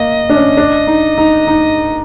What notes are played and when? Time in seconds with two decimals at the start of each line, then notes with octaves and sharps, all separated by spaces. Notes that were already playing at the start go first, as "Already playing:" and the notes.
Already playing: A#3 D#5
0.29 D4
0.35 C#4
0.57 D4
0.87 D#4
1.18 D#4
1.47 D#4